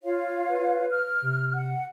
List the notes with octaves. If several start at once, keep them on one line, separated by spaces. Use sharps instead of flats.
F4 C#5 F5
B4
F6
C3
F#5